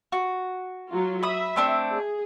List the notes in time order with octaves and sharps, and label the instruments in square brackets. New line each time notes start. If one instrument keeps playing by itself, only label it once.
[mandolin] F#4
[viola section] F#3 F4
[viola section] E5 [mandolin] B5 D#6
[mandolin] A3 C4 D4
[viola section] G#4